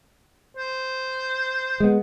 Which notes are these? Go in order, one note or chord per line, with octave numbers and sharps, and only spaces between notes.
C5
G#3 B3